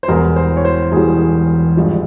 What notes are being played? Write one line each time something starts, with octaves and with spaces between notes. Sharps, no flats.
C5
E1 E2 E3 G3 A#4
C5
C#5
C5
E1 E2 E3 G3 G#4
G#1 G2 F3 G#3